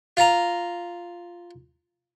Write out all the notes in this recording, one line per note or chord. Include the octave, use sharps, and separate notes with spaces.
F4 A#5